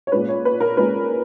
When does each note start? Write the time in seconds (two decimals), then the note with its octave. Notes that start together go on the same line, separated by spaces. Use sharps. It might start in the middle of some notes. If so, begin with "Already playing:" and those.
0.07 C#5
0.12 A#2 G#3 C#4 B4
0.29 C#5
0.45 B4
0.60 A#4
0.77 A#2 G#3 C#4 B4